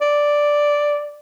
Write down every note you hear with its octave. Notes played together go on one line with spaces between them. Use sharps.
D5